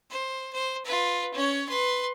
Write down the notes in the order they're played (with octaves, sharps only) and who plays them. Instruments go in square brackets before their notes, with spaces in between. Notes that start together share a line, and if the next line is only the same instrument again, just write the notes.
[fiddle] C5
C5
F4 B4
C#4 C#5
B4 C6